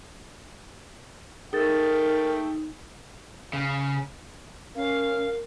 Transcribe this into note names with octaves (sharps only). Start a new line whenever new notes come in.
A3 D#4 G#4 A#4 G5 A6
C#3
C#4 A#4 F5